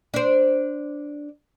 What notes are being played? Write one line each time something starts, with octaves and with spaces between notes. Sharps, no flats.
D4 C5